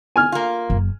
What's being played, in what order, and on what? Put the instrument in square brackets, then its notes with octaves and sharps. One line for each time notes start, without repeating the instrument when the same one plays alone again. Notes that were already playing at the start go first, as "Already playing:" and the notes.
[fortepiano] G#5 F6
[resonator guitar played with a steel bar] A#3 F4
[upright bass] F#1